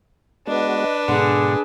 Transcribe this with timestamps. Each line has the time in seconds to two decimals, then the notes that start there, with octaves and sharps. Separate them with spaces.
0.47 G#3 B3 D4 F#4 B4 D#5
1.08 G#2 B2 D3 G#4